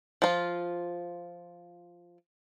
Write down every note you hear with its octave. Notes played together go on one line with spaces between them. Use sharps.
F3 F4